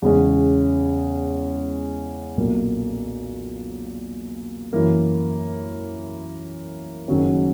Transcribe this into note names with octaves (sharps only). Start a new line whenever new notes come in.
E2 C#3 G#3 C#4
B1 A#2 A#3
F#2 E3 A#3
F#1 F#2 D#3 F#3 C#4